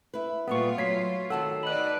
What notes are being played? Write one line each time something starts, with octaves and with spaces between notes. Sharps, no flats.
E4 B4
A#2 G3 A3 B3 F4 G4 C#6
F#3 C#5 B6 C7
D#3 F#4 A4 F#5 A5
D#4 B4 D5 B5 F#6